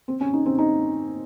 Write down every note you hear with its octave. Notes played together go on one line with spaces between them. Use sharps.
C4
C#4
D#4
C4
D#4